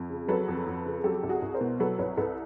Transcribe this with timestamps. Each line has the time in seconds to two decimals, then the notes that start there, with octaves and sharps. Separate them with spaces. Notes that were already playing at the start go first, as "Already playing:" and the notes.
Already playing: F2
0.10 C#3
0.28 F#3 A4 B4
0.48 F2
0.66 F2
0.85 C#3
1.04 F#3 G4 A4
1.23 C2
1.29 F#4 G#4
1.42 C2
1.54 A#4 C5
1.61 B2
1.80 F#3 A4 B4
1.98 C2 B4 C#5
2.17 C2 A4 B4